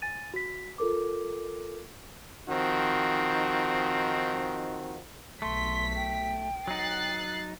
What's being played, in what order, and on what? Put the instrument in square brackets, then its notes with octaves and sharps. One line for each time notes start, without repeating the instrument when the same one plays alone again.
[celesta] G#5 A6 D#7
F#4 B6
F4 A4 A#4 D6
[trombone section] D#3 F3 C4 D#4 F#4
[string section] B1 B6 [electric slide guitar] A3 [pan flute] C6
[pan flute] G5
[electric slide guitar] F#3 D#4 [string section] F#6 A6 C7